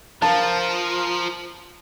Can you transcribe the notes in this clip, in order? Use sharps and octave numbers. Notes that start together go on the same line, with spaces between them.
F3 A#4 F5 A5 A#5